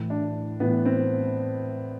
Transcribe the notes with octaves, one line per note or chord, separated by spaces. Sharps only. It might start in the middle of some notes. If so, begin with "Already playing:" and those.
Already playing: A2 E3
D4
A2 E3 B3
C4